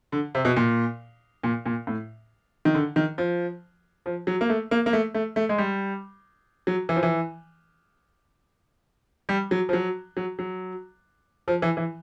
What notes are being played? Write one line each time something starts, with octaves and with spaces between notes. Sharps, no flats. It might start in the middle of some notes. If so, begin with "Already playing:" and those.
D3
C3
B2
A#2
A#2
A#2
A2
D#3
D3
D#3
F3
F3
F#3
A#3
A3
A#3
A#3
A3
A3
A3
G#3
G3
F#3
E3
F3
E3
G3
F#3
F3
F#3
F#3
F#3
F3
E3
E3